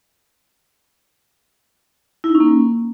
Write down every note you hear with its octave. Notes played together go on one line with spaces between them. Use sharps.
E4
D#4
C#4
A#3